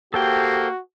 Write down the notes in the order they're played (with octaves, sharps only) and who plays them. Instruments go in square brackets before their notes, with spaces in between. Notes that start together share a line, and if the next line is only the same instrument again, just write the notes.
[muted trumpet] A#3 [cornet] F#4 [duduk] G4 [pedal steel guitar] A4 C5 G5